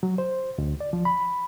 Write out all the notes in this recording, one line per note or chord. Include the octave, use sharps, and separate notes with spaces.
F#3
C5
D2
D5
F3
B5